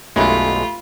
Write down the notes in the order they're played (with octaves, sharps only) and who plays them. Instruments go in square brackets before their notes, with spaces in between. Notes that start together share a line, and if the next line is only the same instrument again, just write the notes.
[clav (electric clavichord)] B1 F#2 G#3 [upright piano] A3 G4 [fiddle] F4 [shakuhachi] B5